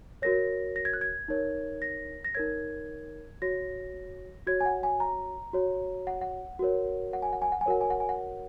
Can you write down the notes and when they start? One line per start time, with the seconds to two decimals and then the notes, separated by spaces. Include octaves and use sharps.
0.22 F#4 A#4 C#5 A#6
0.76 A#6
0.85 G#6
0.93 F#6
1.01 G#6
1.28 D#4 A#4 C#5
1.82 A#6
2.25 A#6
2.35 D#4 A#4 C#5 G#6
3.42 F#4 C#5 A#6
4.47 F#4 C#5 G#6
4.61 G#5
4.66 F#5
4.83 G#5
5.00 A#5
5.53 F#4 C#5
6.07 F#5
6.21 F#5
6.59 F#4 A#4 C#5
7.13 F#5
7.22 G#5
7.33 F#5
7.42 G#5
7.52 F#5
7.61 G#5
7.66 F#4 A#4 C#5 F#5
7.81 G#5
7.90 F#5
8.00 G#5
8.09 F#5